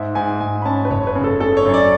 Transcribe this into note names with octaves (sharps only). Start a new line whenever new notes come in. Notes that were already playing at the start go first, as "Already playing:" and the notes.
Already playing: G#2 E5
G#2 G#5
G#2 G#5
B5
C#4 A5
B4
F#1 C#5
B4
C#3
A4
C#3 A4
C#5
F#2
D5